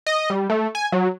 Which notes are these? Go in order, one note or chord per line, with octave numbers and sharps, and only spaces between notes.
D#5
G3
A3
G#5
F#3